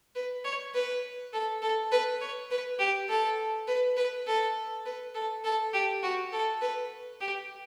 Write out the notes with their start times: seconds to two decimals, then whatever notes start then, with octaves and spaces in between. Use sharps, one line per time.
0.15 B4
0.45 C#5
0.74 B4
1.33 A4
1.62 A4
1.92 B4
2.21 C#5
2.51 B4
2.79 G4
3.09 A4
3.68 B4
3.97 B4
4.27 A4
4.85 B4
5.15 A4
5.44 A4
5.73 G4
6.03 F#4
6.33 A4
6.61 B4
7.21 G4